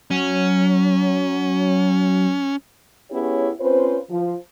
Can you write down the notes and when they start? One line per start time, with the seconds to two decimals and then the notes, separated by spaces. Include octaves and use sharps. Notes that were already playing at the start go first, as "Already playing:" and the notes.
0.11 F#3 C#4
3.11 B3 C#4 E4 G4 G#4 C#5
3.61 C4 C#4 F4 B4 C5
4.10 F3